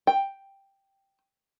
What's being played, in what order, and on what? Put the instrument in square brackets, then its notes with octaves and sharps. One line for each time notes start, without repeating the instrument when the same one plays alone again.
[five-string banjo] G5